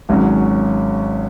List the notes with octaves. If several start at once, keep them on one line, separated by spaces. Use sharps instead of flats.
G#1 G#2 F#3 C#4